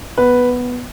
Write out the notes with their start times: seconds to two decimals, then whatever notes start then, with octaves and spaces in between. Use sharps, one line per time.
0.18 B3 B4